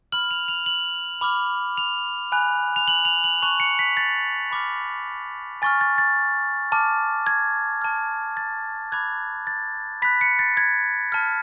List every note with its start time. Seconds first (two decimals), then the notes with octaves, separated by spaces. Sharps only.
0.12 B5 F6 F#7
0.31 F7
0.48 F7
0.66 F#7
1.21 B5 D6 F6
1.77 F7
2.32 G#5 B5 F#6
2.76 F7
2.88 F#7
3.05 F7
3.24 F#7
3.42 A5 C#6 F#6 F7
3.60 C#7
3.79 B6
3.97 A6
4.51 B5 D6 F6
5.62 G#5 C#6 F6 A6
5.81 A6
5.98 A6
6.72 A5 D6 F6
7.27 G#6
7.82 A5 F6
8.37 A6
8.92 B5 D6 F#6 G#6
9.47 A6
10.02 B5 F#6 B6
10.21 C#7
10.39 A6
10.57 G#6
11.12 A5 F6